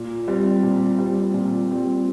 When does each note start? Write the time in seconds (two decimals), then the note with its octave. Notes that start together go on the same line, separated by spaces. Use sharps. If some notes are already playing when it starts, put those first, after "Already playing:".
Already playing: A#2
0.28 G3 C4
0.63 A#2
0.98 G3 C4
1.34 A#2
1.71 G3 C4